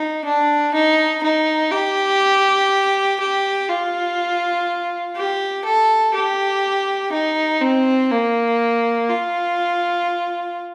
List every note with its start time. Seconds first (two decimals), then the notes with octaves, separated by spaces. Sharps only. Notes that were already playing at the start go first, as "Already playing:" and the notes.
Already playing: D#4
0.24 D4
0.74 D#4
1.23 D#4
1.71 G4
3.20 G4
3.68 F4
5.16 G4
5.65 A4
6.13 G4
7.12 D#4
7.61 C4
8.10 A#3
9.09 F4